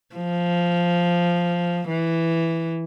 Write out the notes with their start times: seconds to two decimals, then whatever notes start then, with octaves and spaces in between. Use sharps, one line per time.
0.15 F3
1.89 E3